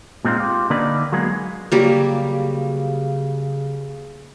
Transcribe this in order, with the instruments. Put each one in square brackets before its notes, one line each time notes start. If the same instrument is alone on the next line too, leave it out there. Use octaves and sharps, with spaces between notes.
[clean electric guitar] A#2 G#3 C4 D#4 F4
F4 G4
D3 A#3 D4 D#4 B4 D5
F#3 G#3 A#3 B3 G#4
[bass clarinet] C#3 [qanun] F#3 G3 A#3